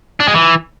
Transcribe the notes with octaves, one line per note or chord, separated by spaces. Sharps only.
D4
G#3
E3